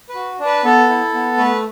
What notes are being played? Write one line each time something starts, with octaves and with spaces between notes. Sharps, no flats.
B4
F#4
D4
B4
B3 A4
E4
B3
A3 B4